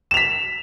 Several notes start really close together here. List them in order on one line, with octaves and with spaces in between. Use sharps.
E7 F7 B6